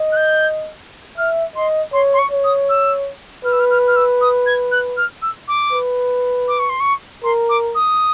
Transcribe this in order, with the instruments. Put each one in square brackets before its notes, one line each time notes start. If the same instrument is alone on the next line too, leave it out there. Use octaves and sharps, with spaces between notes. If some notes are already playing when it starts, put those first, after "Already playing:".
Already playing: [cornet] D#5
[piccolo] F#6
G6
[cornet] E5 [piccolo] F6
[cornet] D#5 [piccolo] C6
[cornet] C#5 [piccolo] C6
[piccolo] C6
C#6
[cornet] C#5
[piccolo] D#6
E6
[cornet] B4 [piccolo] F6
[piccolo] E6
F6
F6
F6
E6
D#6
G#6
F#6
F6
E6
D6
[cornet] B4
[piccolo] D6
C#6
C6
C#6
[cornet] A#4 [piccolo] C6
[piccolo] D6
D#6